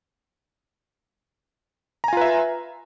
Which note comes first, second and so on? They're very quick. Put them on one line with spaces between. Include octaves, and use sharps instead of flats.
A#5 G#5 F4 B4 E5